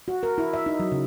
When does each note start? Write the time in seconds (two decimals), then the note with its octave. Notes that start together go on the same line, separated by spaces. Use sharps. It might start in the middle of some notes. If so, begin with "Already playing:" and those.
0.08 F#4
0.23 A#4
0.38 E4
0.53 E5
0.66 D#4
0.80 F#3
0.92 C#3